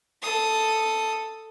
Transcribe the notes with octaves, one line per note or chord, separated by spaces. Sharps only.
A4 D#6